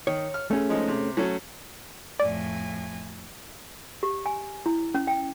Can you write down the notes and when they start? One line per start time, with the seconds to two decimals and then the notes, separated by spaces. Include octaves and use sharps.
0.07 D#3 C#5
0.34 F6
0.51 A3 C#4 G#4
0.69 F3 G#3 D#4
0.88 C3
1.17 F#3 A3 C#4
2.20 F2 A2 D5 G#5
4.03 G4
4.26 G#5
4.66 E4
4.94 C#4
5.07 G5